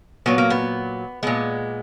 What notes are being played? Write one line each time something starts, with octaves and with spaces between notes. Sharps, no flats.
A#2 F#3 B3
A#3
B3
A#2 G#3 B3